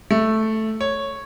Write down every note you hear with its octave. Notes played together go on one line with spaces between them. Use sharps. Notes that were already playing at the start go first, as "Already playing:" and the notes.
A3
C#5